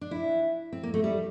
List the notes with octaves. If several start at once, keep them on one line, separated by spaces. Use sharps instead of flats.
D4
E4
C4
A#3
A3
G3